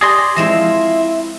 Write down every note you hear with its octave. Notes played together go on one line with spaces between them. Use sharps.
G4 G#4 D5 C6 D#6 A#6
F3 G#3 C4 E4 F4 A#6 E7